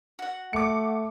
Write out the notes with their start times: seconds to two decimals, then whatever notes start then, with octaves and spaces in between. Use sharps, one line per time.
0.19 F#4 F#5
0.53 A3 D6 C#7